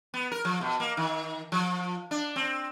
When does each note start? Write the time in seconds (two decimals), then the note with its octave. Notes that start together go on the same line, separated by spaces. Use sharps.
0.14 B3
0.32 A#4
0.45 F3
0.61 B2
0.80 A#3
0.97 D#3
1.52 F3
2.11 D4
2.36 C4